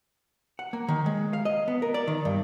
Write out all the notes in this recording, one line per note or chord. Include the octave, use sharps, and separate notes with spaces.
F#5
A#3
D#3
G#3
F5
D#5
B3
A#4
D5
D#3
G2